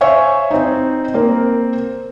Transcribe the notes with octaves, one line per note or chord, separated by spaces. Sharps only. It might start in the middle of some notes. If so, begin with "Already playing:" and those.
C5 C#5 E5 F5 G#5 C#6
C4 D#4
A#3 C4 A#4